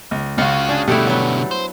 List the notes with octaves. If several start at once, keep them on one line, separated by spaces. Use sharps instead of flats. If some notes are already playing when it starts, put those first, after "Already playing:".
C#2
C#2 C#4 F4 F#4 F5
D4 G#4
B2 D3 G3 A3 E4 G4 F#5
F#3 B3
C5